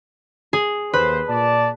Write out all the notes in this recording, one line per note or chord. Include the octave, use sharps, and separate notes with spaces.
G#4
D#2 B4 C5
A#2 D5 A5